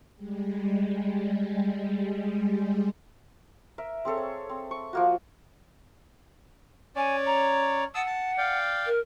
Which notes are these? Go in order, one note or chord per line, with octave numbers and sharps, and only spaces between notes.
G3 G#3
A#4 E5
C4 G#4 A4 C#5
C#5
C4
C#6
F3 A#3 F#4
C#4 C#5 D5 G#5
A#5
F#5 A5 D#6 E6
A5
D5 F5 G5
A#4